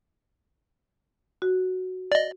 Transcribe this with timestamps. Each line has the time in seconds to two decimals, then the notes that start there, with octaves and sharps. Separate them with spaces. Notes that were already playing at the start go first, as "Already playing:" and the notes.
1.42 F#4
2.12 D5 D#5